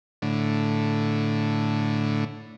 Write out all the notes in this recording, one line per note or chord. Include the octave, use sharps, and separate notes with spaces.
A2 D3